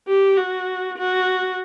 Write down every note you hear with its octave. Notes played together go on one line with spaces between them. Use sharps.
G4
F#4
F#4